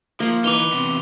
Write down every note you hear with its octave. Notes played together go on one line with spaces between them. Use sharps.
F3 A#3
E3 D#4 B4 D6 F7 G7
E2 C3